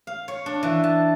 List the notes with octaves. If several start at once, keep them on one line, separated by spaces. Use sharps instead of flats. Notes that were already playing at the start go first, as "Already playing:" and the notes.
F5
C#5
D4
E3
A5